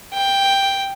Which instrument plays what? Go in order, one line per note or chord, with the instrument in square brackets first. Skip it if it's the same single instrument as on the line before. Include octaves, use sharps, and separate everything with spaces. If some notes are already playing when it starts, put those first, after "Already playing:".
[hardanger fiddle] G5